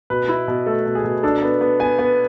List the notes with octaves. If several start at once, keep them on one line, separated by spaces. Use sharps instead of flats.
B2 B4
E4
B2
A3 A4
B2
G#4
B2
D4 A4
B3
B3
B3 G#5
B3